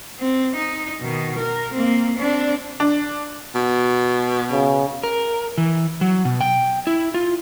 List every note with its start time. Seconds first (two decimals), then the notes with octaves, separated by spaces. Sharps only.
0.19 C4
0.56 D#4
1.00 B2 D#3
1.38 A#4
1.73 A#3 C4
2.17 C4 D4
2.80 D4
3.55 B2
4.52 C#3
5.03 A#4
5.58 E3
6.01 F#3
6.25 B2
6.41 G5
6.87 E4
7.14 F4